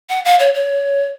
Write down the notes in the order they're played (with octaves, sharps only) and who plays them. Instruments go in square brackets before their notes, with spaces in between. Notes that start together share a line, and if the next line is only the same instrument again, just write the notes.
[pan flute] F#5
F5
C#5
C#5